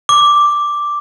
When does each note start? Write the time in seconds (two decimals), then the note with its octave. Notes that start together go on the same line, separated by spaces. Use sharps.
0.09 D6